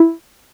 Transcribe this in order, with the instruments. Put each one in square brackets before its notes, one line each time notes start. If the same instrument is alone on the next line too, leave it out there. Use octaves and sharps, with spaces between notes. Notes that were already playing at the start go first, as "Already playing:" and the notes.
Already playing: [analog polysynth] E4